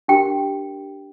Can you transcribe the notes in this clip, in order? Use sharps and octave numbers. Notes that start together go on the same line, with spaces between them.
D4 G4 A#4 G5